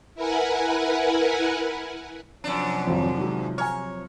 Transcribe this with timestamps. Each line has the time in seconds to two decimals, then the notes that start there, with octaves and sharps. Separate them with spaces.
0.15 E4 A#4 B4 F#5 G#5
2.44 F#2 C3 F3 F#3 D4
2.87 G#1 F2
3.18 D#3 G#3 F#4
3.58 C#5 G#5 A#5 F6